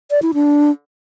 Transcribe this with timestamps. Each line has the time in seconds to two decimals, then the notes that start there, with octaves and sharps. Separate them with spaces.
0.11 D5
0.22 E4
0.34 D4